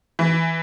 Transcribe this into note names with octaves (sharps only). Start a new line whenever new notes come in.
E3